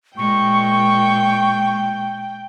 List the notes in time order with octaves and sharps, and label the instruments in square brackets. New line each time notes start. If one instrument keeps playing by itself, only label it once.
[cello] A#2 G#3 [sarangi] G5 [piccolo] C#6